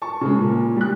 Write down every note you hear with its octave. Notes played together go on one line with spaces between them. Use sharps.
A5 C#6
C#3 G#3
A#2
G3 F#6